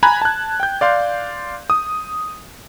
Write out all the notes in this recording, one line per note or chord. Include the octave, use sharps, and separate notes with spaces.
G#5 A#5 B5 F#6 G#6
A5 F#6
G5 G6
D5 F5 C6
D#6